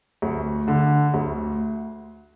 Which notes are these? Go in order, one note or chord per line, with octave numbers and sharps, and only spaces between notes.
D2
D3
D2